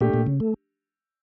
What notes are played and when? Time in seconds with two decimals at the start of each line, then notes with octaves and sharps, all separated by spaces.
0.01 A#2 A3 D4 G4
0.14 A#2
0.27 C#3
0.40 A3